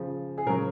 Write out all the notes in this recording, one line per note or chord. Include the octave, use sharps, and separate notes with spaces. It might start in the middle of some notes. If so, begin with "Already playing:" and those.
Already playing: C#3 F3
G#4
C#3 F#3 A#4